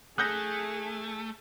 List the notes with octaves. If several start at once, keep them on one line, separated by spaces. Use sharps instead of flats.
A3 G#4 D#6 F#6 G6 A#6